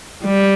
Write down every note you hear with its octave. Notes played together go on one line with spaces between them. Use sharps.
G3